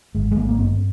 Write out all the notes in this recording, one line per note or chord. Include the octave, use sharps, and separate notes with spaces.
G#1 G#3
G#3
G#1 A#3
A#3
G2 C4